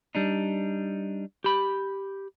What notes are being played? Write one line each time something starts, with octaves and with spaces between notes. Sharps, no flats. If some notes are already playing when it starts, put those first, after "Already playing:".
G3 D4 D#4
G4 B5